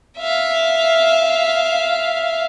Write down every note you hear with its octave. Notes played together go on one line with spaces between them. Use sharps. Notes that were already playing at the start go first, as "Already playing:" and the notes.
E5 F5